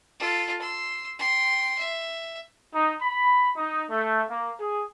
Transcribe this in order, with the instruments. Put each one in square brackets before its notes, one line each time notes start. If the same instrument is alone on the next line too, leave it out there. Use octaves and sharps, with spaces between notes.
[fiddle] F4 A4
C6 E6
G5 C6
E5
[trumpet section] D#4
B5
D#4
A3
A#3
G#4